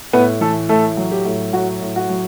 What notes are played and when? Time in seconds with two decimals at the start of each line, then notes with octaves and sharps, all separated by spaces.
0.13 A2 B3 B4
0.41 E3 A3 A4
0.69 A2 A3 A4
0.97 F#3
1.12 G4
1.25 A2
1.53 F#3 F#4
1.81 A2
1.96 F#4
2.09 F#3